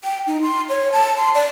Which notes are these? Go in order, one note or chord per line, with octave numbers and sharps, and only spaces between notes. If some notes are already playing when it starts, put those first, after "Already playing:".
G5
D#4
C6
C#5
A5
C6
D5